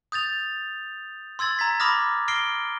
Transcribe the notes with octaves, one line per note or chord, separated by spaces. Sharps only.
D#6 G6 A6 F7
C6 E6 G#6 A6 F#7
A#5 G#6 B6
B5 C6 D6 D#6 F6 A#6
F6 A#6 C7 D7 G7